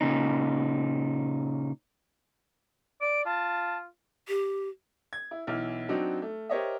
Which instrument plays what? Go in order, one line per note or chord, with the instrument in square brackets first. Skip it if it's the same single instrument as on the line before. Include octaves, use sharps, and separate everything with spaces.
[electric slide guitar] A#2 C#3 D#4
[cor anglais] D5 [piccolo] D7
[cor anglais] F4 [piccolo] A5
[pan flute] G4
[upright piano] G#6
E4
B1 E3 E4 F6
F#3 C4 D4 D#4 F#4
A3
G4 A#4 C5 C#5 D#5 E5